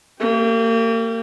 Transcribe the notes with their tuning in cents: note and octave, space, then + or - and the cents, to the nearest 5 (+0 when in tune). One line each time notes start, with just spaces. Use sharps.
A#3 -35 G4 +0